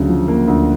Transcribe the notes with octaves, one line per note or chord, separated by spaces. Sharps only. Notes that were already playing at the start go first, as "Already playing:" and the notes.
Already playing: D2 C#3 F#3
F3
A#3
D2